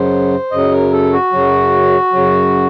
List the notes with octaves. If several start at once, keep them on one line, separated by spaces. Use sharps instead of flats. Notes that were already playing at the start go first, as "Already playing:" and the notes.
Already playing: F#2 C#3 F#3 C5
F#2 C#3 F#3 D#5
A#4
A4
F#4
F#2 C#3 F#3
F#2 C#3 F#3